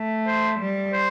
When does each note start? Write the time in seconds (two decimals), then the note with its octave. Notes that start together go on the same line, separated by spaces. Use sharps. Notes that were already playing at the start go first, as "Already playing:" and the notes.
Already playing: A3
0.27 C5
0.60 G3
0.93 C5